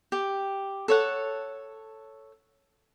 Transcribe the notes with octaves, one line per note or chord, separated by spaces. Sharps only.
G4
A4 C#5 F#5